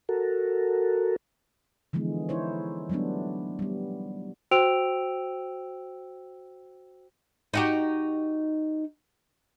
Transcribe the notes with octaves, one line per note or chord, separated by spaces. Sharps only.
F#4 A4 A#4
D3 E3 F3 G#3 B3
D#4 E4 C5 C#5
F#3 G3 A3 B3 D4
G3 B3
F#4 C5 G5 E6 D7 F7
D#4 F#4 G4